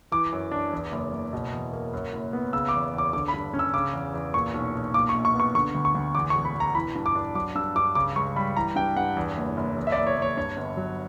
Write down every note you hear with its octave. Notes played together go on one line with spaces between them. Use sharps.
E3 D6
F#2
D4
E2
F#1
F#1
B2
E2
A#3
F#2
F#1
B3
C#3 E6
D6
E2
E2
D6
D3 D6
B5
G2
C#4
E6
C#3 D6
E2
E2
A#2 C#6
B1
B1
A#2 D6
C#6
A#1
C#6
B3
C#6
D3 C#6
D2
C#6
D2
E2 D6
C#6
E1
B5
E1
A#5
E3 B5
G2
D6
D4
F#3 D6
G2 E6
G2 D6
C#3 D6
C#2 C#6
G3 B5
E3 A#5
G2 G5
G2 F#5
E2
F#1
F#1
E2
E5
D5
F#1
C#5
F#1
C#5
G2 C#5
G1
F#3